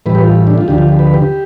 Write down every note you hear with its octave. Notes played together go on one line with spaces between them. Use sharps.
A2 E3 G3 B4
G4
F4
D4
F4
D2 D3 F3 G4
F4
G4
B4
G4